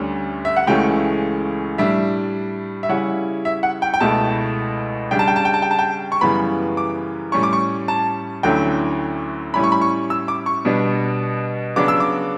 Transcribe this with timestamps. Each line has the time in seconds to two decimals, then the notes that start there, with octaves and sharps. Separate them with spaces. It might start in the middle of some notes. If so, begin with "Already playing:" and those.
Already playing: D2 D3 G3 C#4
0.45 E5
0.56 F#5
0.67 C#2 C#3 E3 A3 C#4 G5
1.78 A2 G3 D4 E5
2.83 E5
2.89 C#3 G3 C#4 E4 F#5
3.45 E5
3.63 F#5
3.82 G5
3.94 G5
4.00 C#2 B2 A3 E4 A5
5.11 C#3 G3 D4 G5
5.19 A5
5.28 G5
5.36 A5
5.45 G5
5.54 A5
5.62 G5
5.71 A5
5.79 G5
6.12 C#6
6.21 F#2 C#3 E3 G3 B3 B5
6.77 D6
7.32 A2 G3 C#4 C#6
7.43 D6
7.53 C#6
7.88 A5
8.43 D2 D3 F#3 C#4 E4 G5
9.54 A2 G3 C#4 E4 B5
9.63 C#6
9.72 B5
9.81 C#6
10.10 E6
10.28 D6
10.46 C#6
10.65 B2 G3 B3 D4
11.76 C#3 F#3 B3 D4 D6
11.88 E6
12.00 D6